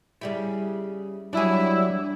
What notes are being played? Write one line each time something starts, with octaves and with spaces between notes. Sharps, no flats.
C#3 G3 E4
F#3 G3 D4 E4 G#4